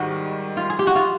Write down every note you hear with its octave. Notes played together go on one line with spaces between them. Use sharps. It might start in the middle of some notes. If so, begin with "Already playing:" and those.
Already playing: G#2 D#3 G3 F#4
F4
G#4
G4
F#4
F4